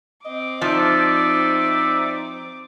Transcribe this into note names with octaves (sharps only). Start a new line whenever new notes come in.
C4 D#5 D6
F3 D#4 D5 E5